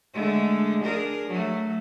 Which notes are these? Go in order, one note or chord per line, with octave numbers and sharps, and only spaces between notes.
D3 G#3 A3
D4 G#4 A#4
F#3 A3